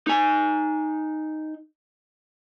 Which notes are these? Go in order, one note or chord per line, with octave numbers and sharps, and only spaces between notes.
D#4 G#5